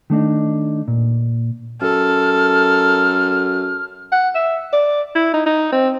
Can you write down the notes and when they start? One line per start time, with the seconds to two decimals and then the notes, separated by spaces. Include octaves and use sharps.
0.10 D#3 A3 D4 D#4
0.88 A#2
1.81 F#2 A4 F6
4.12 F#5
4.35 E5
4.73 D5
5.15 E4
5.34 D#4
5.46 D#4
5.72 C4